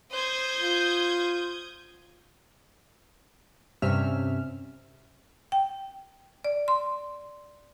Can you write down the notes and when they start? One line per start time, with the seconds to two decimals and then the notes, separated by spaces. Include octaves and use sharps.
0.12 C5 D#6 G6 G#6
0.57 F4
3.82 G2 C3 C#4 E5 F6
5.52 G5
6.44 D5
6.68 C6